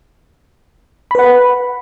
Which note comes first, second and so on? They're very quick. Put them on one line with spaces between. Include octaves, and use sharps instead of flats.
B5 B4 F#5